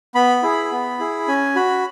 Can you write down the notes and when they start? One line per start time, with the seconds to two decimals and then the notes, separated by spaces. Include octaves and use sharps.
0.15 B3 B5
0.43 E4 G#4
0.72 B3
0.99 E4 G#4
1.28 C#4 G#5
1.55 F#4 B5